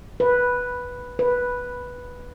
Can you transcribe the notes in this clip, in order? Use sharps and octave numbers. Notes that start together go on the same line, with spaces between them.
B4
B4